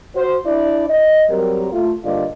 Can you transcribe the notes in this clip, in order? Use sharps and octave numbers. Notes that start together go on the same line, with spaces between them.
F#4 C5
D4 E4 D5
D#5
F#3 G3 C4 G4 A#4
A3 F4
G2 D3 A#3 F4 D5 D#5